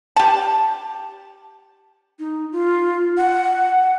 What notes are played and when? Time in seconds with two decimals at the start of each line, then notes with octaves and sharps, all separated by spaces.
0.16 G4 A5
2.19 D#4
2.52 F4
3.17 F#5